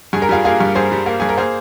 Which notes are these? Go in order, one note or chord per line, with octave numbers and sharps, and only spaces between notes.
G2 G#4
A#4
G3 F4 G#4
A#3 F4 G#4
G2
G2 G#4 C5
G3
A#3
G2 G#4
A#4
A#3 G#4 C5